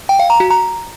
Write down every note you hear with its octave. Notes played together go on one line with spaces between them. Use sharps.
G5
F5
A#5
F#4
A#5